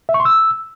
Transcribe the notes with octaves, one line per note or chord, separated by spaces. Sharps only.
E5
C#6
C6
E6